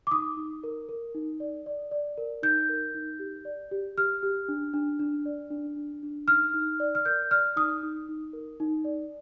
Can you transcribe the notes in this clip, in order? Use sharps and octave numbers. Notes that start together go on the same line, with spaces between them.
D6
D#4 D#6
D#4
A#4
A#4
D#4
D5
D5
D5
A#4
D#4 G6
A#4
D#4
G4
D5
G4
G4 F6
G4
D4
D4
D4
D5
D4
D4
D4
D#4 F6
D#4
D5
F6
A#4 G6
D5 F6
D#4 D#6
D#4
D#4
A#4
D#4
D5